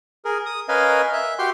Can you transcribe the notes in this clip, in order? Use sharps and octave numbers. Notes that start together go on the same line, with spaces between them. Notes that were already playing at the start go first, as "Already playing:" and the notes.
G#4 A#4
D#6
C#4 A#4 B4 D#5 F5 G#5
E5
F#4 G4 G5 C6